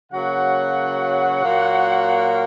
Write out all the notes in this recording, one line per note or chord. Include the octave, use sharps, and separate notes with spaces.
C#3 F#3 A#3 F#4 F#5
A#2 F#3 A#3